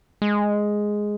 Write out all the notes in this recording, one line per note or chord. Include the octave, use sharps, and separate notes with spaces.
G#3